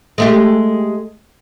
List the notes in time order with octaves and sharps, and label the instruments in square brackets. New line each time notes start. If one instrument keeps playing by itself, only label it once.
[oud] G#3 A3 G4